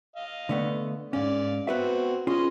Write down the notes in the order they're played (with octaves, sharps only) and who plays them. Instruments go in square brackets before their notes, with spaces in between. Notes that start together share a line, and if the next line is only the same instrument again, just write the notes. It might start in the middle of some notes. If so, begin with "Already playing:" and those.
[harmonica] D#5 F5
[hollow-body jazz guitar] D3 A3 B3
[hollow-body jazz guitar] G#2 C#4 [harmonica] D5 F5
[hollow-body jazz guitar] B3 B4 E5 [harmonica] C4 F#4
[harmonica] B3 D#5 C6 [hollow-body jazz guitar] C#4 F4 G#4